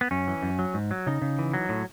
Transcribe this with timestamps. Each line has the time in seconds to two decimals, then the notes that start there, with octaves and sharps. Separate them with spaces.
0.01 B3
0.11 F#2 C#4
0.27 E3
0.42 F#2
0.59 F#3
0.74 G#2
0.91 F#3
1.07 C#3 D#4
1.22 C#3
1.39 E3
1.54 F#3
1.69 A2